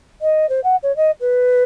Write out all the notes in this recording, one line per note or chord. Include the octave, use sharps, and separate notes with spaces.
D#5
C5
F#5
C#5
D#5
B4